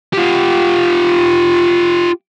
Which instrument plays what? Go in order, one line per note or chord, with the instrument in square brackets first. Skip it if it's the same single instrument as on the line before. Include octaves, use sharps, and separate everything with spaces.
[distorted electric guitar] F4 G4